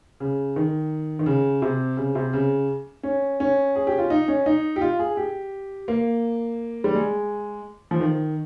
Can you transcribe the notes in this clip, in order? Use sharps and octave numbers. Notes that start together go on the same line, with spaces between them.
C#3
D#3
D#3
C#3
C3
C#3
C3
C#3
C#4
C#4
G#4
G4
F4
D#4
C#4
D#4
G4
F4
G#4
G4
A#3
G3
G#3
F3
D#3